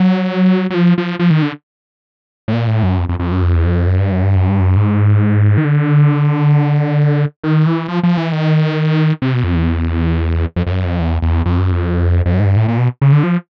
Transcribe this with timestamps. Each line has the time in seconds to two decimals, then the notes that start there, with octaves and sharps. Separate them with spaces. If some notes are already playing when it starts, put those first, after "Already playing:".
Already playing: F#3
0.70 F#3
0.74 F3
0.98 F3
1.19 F3
1.31 D#3
1.42 D3
2.48 A2
2.53 A#2
2.67 A2
2.83 F#2
2.98 F2
3.09 F2
3.19 F2
3.32 F#2
3.42 F2
3.56 E2
3.65 F2
3.87 F#2
3.99 G2
4.12 F#2
4.23 G2
4.36 F#2
4.49 G2
4.60 F#2
4.77 G#2
5.58 D#3
5.65 D3
7.44 D#3
7.66 E3
7.88 F3
8.03 F3
8.17 E3
8.32 D#3
9.22 C3
9.34 B2
9.44 F2
9.55 E2
10.56 F2
10.66 F2
10.71 F#2
10.85 F2
11.00 E2
11.22 E2
11.45 F2
11.58 F#2
11.72 F2
12.26 F2
12.34 F#2
12.40 G#2
12.45 G2
12.56 A2
12.68 A#2
12.78 B2
13.01 C#3
13.12 D3
13.23 F3